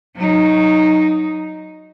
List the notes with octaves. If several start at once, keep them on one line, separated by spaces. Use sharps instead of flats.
F#3 D#4